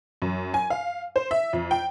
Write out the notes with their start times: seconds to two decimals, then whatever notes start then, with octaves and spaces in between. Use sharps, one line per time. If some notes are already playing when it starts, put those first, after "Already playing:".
0.22 F#2
0.54 G#5
0.70 F5
1.16 C5
1.31 E5
1.53 F2
1.71 G5